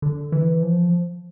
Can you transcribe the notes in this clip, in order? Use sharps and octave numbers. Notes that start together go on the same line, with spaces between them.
D3
E3
F3